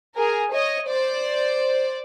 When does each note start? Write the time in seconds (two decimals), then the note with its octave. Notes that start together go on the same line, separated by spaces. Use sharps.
0.18 G#4 A#4
0.53 C#5 D#5
0.89 C5 D5